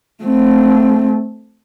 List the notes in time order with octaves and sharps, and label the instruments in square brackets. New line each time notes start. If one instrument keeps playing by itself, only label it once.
[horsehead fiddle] A3 C4